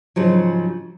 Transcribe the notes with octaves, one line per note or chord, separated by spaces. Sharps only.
G#2 C#3 F3 F#3